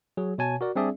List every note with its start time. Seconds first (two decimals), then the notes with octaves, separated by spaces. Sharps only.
0.17 F#3 G#4
0.38 B2 C#5 G#5 A5
0.61 F#4 A#4 D5
0.76 G3 C4 D4 G#4 D5 E5